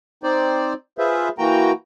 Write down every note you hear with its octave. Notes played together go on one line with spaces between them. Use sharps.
C4 D#4 C5 D5
F4 G#4 B4 C5 E5
E3 A#3 F#4 G5 A#5